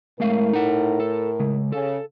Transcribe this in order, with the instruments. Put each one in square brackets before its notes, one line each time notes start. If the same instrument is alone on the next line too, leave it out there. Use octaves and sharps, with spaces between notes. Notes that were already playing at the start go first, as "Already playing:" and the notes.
[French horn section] A2 A#4 [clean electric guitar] G#3 A3 F5
[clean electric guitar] D#4 F#5
A4
C#3 G#3
[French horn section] C#3 [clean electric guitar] A4